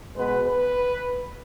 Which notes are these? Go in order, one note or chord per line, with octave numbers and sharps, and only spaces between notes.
B2 G#3 B3 B4
B4